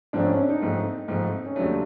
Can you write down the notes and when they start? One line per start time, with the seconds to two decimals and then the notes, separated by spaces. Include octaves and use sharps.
0.13 G#2 F3 A3 C4 D4
0.25 C#4
0.37 D4
0.49 D#4
0.60 G#2 F3 A3 C4
1.08 G#2 F3 A3 C4
1.46 C#4
1.56 D#2 C#3 F#3 A3 D4